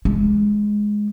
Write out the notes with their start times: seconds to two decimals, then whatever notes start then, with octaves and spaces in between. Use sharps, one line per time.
0.05 G#3